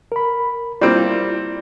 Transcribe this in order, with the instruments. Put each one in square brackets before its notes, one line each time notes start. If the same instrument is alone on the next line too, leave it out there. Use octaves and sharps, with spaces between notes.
[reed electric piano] A#4 B5
[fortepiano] G3 A#3 C4 [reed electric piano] E4 F4